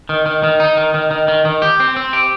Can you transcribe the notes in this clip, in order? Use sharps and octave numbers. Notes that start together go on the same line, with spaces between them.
D#3
D#3
D#3
D#4
D#3
D#3
D#3
D#3
D#3
G4
C4
C4
G4